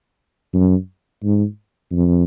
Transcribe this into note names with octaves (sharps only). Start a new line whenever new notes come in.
F#2
G#2
F2